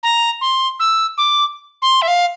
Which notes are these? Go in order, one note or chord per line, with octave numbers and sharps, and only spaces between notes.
A#5
C6
E6
D6
C6
E5
F5